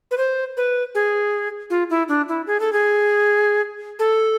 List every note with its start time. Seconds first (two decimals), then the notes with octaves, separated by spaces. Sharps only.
0.11 B4
0.18 C5
0.57 B4
0.95 G#4
1.70 F4
1.90 E4
2.08 D4
2.29 E4
2.47 G#4
2.60 A4
2.73 G#4
3.99 A4